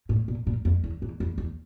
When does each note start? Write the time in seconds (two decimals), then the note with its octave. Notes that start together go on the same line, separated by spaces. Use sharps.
0.09 A2
0.28 A#2
0.47 A#2
0.65 F2
0.84 E2
1.02 E2
1.20 E2
1.38 E2